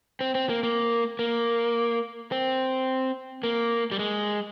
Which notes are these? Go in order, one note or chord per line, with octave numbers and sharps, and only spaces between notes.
C4
C4
A#3
A#3
A#3
C4
A#3
G3
G#3